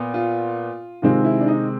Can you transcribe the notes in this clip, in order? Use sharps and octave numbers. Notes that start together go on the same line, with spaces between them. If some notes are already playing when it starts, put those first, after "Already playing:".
Already playing: A#2 B3
F4
C3 D#3 G#3 C4 F4
E4
D4
D#4